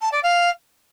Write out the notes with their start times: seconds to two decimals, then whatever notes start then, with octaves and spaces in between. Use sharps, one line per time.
0.01 A5
0.12 D5
0.23 F5